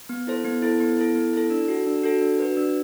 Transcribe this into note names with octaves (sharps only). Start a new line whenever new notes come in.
B3
E4 A4 C5
B3
E4 A4 C5
B3
E4 A4
B3
E4 A4
D4
F#4 A4
D4
F#4 A4
D4
F#4 B4
D4